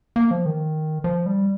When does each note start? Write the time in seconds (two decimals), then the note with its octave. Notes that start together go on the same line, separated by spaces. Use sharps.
0.16 A#3
0.31 F3
0.46 D#3
1.04 F3
1.26 G3